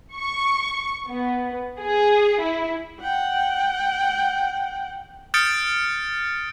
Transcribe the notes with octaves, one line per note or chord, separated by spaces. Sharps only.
C#6
B3
G#4
E4
F#5 G5
D#6 F6 G6 A6 C#7 D7